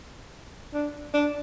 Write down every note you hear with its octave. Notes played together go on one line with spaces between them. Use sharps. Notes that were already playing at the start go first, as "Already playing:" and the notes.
D4
D4